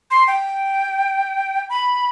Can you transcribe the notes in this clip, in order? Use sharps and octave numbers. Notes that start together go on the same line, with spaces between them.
C6
G5
B5